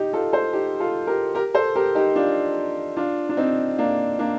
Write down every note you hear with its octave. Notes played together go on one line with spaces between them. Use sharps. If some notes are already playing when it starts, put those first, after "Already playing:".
Already playing: D#4 G4
F4 A4
A4 C5
D#4 G4
F4 A4
G4 A#4
G4 A#4
A4 C5
G4 A#4
D#4 G4
D4 F4
D4 F4
D4
C4 D#4
A#3 D4
A#3 D4